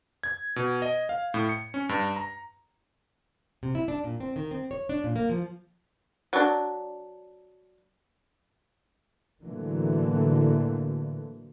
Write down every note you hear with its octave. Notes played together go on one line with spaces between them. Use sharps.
G#6
B2
D#5
F5
A2
C#7
C#4
G2
A#5
C3
E4
D4
A#2
C4
D#3
C4
C#5
D4
A#2
A#3
F3
F#3 D4
A2 D3 E3 F#3 A3 A#3